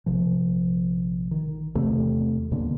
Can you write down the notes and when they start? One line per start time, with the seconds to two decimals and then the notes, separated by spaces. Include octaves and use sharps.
0.06 A#1 C3 F3
1.31 D#3
1.75 E2 C3 A3
2.51 D#2 B2 D3 A#3